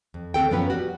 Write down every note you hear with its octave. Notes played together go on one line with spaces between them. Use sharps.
F2
D2 C4 A4 G5
F#2 F3 F#3 B3 C#4 B4
G3 F#4